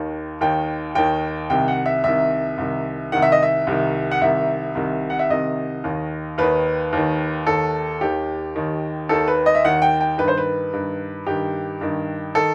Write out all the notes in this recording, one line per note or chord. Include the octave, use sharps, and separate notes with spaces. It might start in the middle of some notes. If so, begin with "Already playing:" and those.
Already playing: D#2 D#3
D#2 D#3 G5
D#2 D#3 G5
C2 C3 D#3 G5
F#5
E5
C2 C3 D#3 E5
C2 C3 D#3
C2 C3 D#3 F#5
E5
D#5
E5
C2 C3 D#3
F#5
C2 C3 D#3 E5
C2 C3 D#3
F#5
E5
C2 C3 D#3 D#5
D#2 D#3
D#2 D#3 B4
D#2 D#3
D#2 D#3 A4
D#2 D#3 G4
D#2 D#3
D#2 D#3 A4
B4
D#5
E5
D#2 D#3 F#5
G5
G5
G2 D#3 B4
C5
B4
G2 D#3
G2 D#3 G4
G2 D#3
D#3 A4